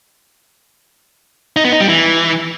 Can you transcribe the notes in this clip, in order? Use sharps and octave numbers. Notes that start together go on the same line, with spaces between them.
D#4
B3
D#4
G3
E3